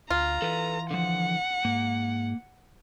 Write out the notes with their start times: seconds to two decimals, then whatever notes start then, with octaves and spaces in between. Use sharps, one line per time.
0.10 D2 F4 A#5
0.42 E3 A4 B4
0.91 D3 F3 F#5
1.65 G#2 A#3